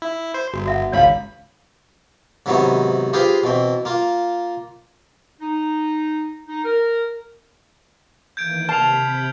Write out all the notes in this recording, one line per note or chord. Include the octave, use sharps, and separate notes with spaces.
E4
C5
G1 F#4
F#4 E5 F#5
G#1 C#2 C#5 F5 B5
G#2 C3 D#3 F#3 B3 E4
F4 G4 G#4 B4 C5 F5
B2 E3 C4
A#3 F4
D#4
D#4
A#4
D#3 E3 A#3 G6 G#6 D7
C3 A5 B5 F6 C7 F7